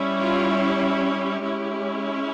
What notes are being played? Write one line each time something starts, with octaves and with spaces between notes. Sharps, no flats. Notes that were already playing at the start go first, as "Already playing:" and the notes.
Already playing: G3 C#4 E4
F4
G4
G#3 C#4 E4